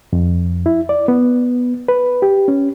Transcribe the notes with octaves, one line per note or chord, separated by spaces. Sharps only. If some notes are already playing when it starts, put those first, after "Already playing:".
F2
E4
D5
B3
B4
G4
C#4